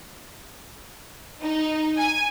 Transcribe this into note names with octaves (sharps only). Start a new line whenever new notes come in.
D#4
G#5